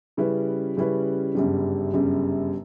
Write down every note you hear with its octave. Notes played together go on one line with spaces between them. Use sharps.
C#3 G3 C#4 E4 B4
C#3 G3 C#4 E4 B4
G1 F#2 C#3 G3
G1 F#2 C#3 G3